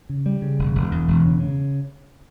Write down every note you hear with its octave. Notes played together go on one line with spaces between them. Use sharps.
C#3
G3
C#3
E1
E1
E2
E1
C#3
C#3